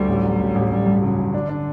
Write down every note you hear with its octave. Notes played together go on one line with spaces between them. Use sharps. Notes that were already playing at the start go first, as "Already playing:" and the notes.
Already playing: D2 G3
A1
F#3
A1
A1
A1 G3
G2
C#3 F#3
A1
D3 D4
D4